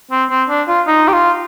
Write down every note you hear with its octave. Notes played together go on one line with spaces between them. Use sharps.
C4
C4
D4
F4
D#4
G4
F4